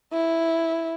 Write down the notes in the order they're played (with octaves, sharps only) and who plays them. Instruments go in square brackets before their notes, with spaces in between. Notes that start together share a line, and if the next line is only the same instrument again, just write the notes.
[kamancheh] E4